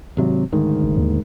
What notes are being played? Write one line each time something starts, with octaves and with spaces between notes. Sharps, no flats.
G#1 C3 F#3
D2 G#2 D#3
F#1
D#2